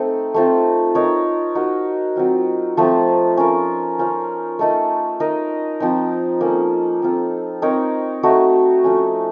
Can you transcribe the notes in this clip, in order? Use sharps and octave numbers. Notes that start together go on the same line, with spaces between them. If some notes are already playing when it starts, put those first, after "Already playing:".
Already playing: A3 C4 D#4 A4
A3 C4 F4
D#4 A#4 C#5
D#4 F#4 A#4 D#5
F#3 C4 F4
F3 A3 C4 F4
C#4 F4 A#4
C#4 F4 C5 F5
A3 D#4 A4 D#5
D#4 A#4 D#5
F3 C4 D#4
A#3 C#4 A4
C4 F4 A4
C4 D#4 A#4 C#5
A3 D#4 F#4
F3 A3 C#4